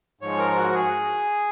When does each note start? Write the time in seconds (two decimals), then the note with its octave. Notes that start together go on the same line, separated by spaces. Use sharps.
0.21 G#2 F3 G#3 C#5
0.39 A#4
0.57 F#4
0.74 G#4